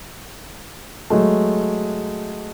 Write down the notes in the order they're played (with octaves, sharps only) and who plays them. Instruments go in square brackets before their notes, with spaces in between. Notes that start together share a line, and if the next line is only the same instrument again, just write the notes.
[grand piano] F#3 G#3 A3